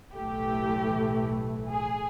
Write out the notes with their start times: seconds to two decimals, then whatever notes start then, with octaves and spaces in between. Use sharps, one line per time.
0.15 B1 A2 E3 A3 G4
1.70 G#4